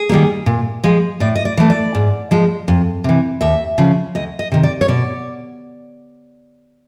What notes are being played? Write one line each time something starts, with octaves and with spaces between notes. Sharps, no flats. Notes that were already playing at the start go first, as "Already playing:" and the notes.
Already playing: G#4
D#3 G3 A#3
A#2
F3 G#3
A2 D5
D#5
D5
E3 A3
D5
G#2
F3 G#3
F2
C3 E3
D#2 E5
C#3 F3
D2 D#5
D#5
C3 D#3
D5
C#5
B2 D5